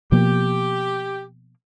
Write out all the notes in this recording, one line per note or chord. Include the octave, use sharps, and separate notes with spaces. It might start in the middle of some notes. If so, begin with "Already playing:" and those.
B2 F3 A#3 G4